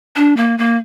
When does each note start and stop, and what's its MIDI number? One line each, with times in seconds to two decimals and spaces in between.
0.16 0.34 62
0.37 0.57 58
0.58 0.77 58